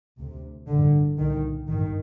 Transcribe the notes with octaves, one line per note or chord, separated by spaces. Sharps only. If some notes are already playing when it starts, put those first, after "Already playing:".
D2 C3
A1 G2 D3
C2 A#2 D#3
A1 G2 D#3